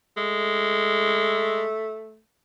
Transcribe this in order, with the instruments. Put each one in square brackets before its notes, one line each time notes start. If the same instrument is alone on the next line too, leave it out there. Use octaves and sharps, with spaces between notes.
[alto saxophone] G#3 [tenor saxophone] A3